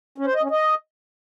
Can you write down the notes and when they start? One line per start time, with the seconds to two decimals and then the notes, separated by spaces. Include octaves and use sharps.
0.18 C#4
0.26 C5
0.34 D#5
0.43 C#4
0.51 D#5